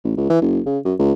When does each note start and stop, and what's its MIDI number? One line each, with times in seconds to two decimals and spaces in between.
0.04 0.13 33
0.17 0.26 37
0.30 0.40 52
0.42 0.60 30
0.66 0.79 49
0.85 0.94 42
0.99 1.13 37